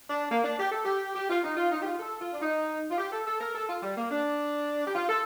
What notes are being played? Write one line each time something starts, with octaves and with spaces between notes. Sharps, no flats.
D4
A#3
D4
G4
A4
G4
G4
F4
D#4
F4
D#4
G4
F4
A4
F4
D4
D#4
F4
G4
A4
A4
A#4
A4
F4
G3
A#3
D4
G4
F4
A4